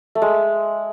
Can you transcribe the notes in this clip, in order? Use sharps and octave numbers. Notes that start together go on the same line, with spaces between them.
A3
G#3